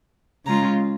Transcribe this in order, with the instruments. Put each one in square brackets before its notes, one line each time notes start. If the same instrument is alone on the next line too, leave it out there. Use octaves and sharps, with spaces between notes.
[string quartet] C#3 G#3 C#4 F4 A#5